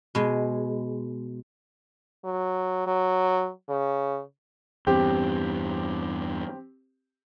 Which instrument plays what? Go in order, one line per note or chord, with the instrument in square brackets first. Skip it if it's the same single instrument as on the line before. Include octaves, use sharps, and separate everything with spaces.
[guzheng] B2 G#3
[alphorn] F#3
F#3
C#3
[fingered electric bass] E2 G2 [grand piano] C4 G4